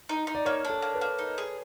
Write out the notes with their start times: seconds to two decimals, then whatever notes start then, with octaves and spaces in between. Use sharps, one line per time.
0.09 D#4
0.27 D#4
0.35 D5
0.45 A#3 C#5
0.65 D4
0.70 A4
0.82 A#3
0.94 B4
1.01 A#3
1.19 D#4
1.38 G#4